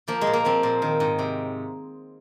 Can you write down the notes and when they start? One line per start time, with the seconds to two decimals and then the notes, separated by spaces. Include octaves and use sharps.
0.08 F3 A#3
0.21 G#3
0.27 A#2
0.33 A#3
0.45 F3 C4
0.63 A#2
0.82 D#3
1.00 G#2
1.19 C3